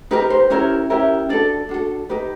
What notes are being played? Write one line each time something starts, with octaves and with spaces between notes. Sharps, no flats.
D#4 G4 A#4 B4
C5
C#4 E4 G4 A#4 C#5
C#4 E4 G4 A#4
D4 F#4 A4 D5
D4 F#4 A4
D#4 G4 B4